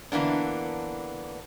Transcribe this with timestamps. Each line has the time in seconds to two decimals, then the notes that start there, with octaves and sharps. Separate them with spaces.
0.12 D3 E3 A#3 B3 D4